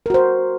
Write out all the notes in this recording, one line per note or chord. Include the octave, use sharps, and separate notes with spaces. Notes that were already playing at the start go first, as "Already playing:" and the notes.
F#4 A#4 C5